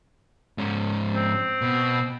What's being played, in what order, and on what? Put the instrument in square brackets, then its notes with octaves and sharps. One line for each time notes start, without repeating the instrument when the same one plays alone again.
[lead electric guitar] G#2 C#4
[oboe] C4
[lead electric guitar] B2